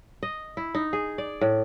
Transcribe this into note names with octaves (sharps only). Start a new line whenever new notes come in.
D#5
E4
D#4
G#4
D5
A2